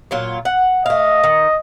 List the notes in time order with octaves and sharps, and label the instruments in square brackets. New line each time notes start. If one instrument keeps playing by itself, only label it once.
[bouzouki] A#2 F#3 F4
F#5
[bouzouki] A3 F5 [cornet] D#5
[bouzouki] D#3